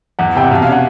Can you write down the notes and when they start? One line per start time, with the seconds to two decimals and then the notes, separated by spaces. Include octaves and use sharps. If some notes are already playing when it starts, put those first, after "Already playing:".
0.19 E2 F#5
0.36 C3 G5
0.44 F#5
0.51 B2 F5
0.62 F5
0.67 C#4 F#5